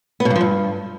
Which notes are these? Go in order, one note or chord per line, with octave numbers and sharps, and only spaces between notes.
B3
B2
G2
F3
G2